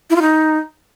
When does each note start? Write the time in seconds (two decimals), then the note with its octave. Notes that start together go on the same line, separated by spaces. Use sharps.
0.10 E4
0.16 F4
0.22 D#4